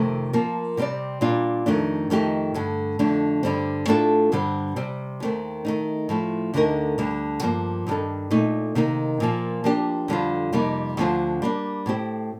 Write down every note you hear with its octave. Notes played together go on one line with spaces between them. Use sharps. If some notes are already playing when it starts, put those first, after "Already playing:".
Already playing: F2 C3 D#3 A3 C4
F3 A#3 F4 A#4
C3 G3 C4 G4 D5
A#2 G3 D4 F4
F2 D#3 A3 D4
F2 D#3 A3 D#4 G4
G2 D3 A3
F2 D3 A3 D4
G2 D3 G3 C4
A2 A3 D4 F4 A4
G2 D3 G3 C4
C3 G3 C4
D#2 D#3 A3 C4
D#3 A3 D#4
A2 F3 A3
D2 D3 A3 D#4 A#4
D2 D3 G3
G2 F3 A#3
G2 D#3 G3 D4 A4
A#2 A3 D#4
C3 D#3 A#3 D#4
A#2 F3 A#3
F3 A#3 D4 G4
F2 D3 G3 C4 F4
F2 C3 G3 A#3 D#4
D2 D3 F3 C4 F4
G3 A#3 D4
A2 A3 C4 G4